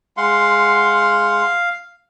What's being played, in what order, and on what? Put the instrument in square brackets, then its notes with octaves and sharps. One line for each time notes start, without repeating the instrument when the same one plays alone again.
[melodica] G#3 F#5 C6 [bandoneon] F5